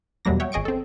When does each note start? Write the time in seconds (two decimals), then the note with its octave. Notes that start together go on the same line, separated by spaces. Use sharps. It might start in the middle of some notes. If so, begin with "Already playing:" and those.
0.25 E2 B2 F#3 G3 A#3 A#6
0.40 C#5 E5 F#5 G5
0.52 G#1 G#4 D#5 C#6 D7
0.65 C4 A4